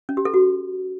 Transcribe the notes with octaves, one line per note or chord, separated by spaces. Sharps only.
C#4
G4
A4
F#4